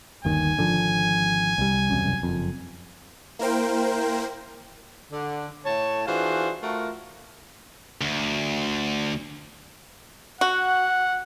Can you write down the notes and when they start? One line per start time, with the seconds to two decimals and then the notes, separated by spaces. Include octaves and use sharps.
0.25 G1 D#2 D#3 G#5
0.57 G#1 D3 F3
1.58 C2 G3
1.90 E1 C2 F#2
2.23 F#1 F2
3.39 A#3 E4 A#4 C5 G5
5.12 D3
5.65 A2 C#5 A5
6.07 E3 D4 F4 F#4 G#4 C5
6.61 A3 F4 F#4 A#4
8.01 D2
10.41 F#4 F#5